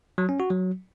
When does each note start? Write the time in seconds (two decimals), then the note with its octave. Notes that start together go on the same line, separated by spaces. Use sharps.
0.18 F#3
0.29 C#4
0.40 F#4
0.50 F#3